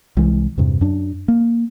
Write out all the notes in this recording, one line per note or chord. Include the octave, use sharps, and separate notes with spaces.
C2 E3 G#3
E2 G2 C3
F#2 D4
A#3